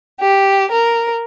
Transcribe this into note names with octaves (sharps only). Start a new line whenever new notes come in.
G4
A#4